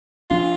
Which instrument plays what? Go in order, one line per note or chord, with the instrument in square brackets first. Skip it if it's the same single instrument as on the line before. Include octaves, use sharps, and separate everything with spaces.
[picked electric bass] F3 D4 [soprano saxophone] F4